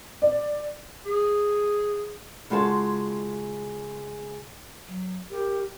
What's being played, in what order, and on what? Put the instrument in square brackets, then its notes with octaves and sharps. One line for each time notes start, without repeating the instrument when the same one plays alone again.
[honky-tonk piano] D5
[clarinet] G#4
[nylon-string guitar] C#3 G#3 F4 F#4 C#5 A5
[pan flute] F#3
[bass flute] G4 [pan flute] A#4